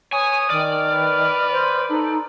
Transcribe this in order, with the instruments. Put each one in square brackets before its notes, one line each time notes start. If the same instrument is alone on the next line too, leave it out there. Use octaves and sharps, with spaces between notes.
[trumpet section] B4 D#6 [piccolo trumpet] C#5 [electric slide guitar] G#5
[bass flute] D#3 [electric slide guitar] D5 [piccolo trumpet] F6
[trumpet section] B4
[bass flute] C5
[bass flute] D#4 [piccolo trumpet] A4